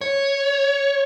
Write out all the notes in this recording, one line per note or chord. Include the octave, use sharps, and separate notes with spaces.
C#5